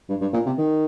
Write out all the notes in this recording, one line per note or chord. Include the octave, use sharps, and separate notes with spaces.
G2
G2
A#2
C3
D#3